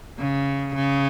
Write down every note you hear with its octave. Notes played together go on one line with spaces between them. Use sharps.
C#3
C#3